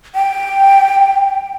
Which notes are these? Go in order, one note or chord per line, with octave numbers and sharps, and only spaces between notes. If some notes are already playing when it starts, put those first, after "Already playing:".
G5